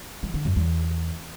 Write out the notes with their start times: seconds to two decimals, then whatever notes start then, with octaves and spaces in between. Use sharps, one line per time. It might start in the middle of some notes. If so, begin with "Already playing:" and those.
0.23 F3
0.34 D3
0.45 F#2
0.56 E2